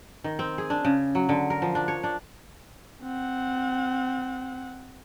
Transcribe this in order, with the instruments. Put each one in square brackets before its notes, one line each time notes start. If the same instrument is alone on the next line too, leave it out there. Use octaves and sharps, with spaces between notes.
[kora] D#3
C4
G#4
D4
C#3
F#3
D3
A#4
F3
D4
C#5
D4
[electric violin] C4 F#5